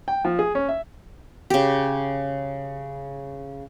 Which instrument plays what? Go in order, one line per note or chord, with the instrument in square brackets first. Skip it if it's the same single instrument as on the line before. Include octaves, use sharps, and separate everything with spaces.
[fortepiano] G5
F3
G#4
C#4
E5
[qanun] C#3 G4